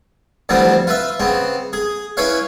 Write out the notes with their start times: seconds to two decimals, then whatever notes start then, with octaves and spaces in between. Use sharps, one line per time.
0.49 D2 E3 F3 G3 B3 C4
0.87 F4 B4 E5
1.20 C#3 B3 C4
1.73 G#4
2.17 C#4 E4 B4 C#5 F5